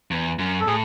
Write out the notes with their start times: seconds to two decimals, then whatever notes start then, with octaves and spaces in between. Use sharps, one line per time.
0.11 E2
0.39 F#2
0.61 A4
0.67 A2 G#4